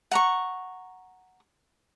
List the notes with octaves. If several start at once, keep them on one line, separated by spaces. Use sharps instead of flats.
F#5 A#5 C#6